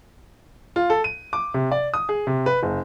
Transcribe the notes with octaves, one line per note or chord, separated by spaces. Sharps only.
F4
A4
D#7
D6
C3
D5
D#6
G#4
C3
B4
F#1